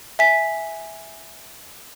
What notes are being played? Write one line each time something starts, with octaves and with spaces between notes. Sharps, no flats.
E5 G#5 B6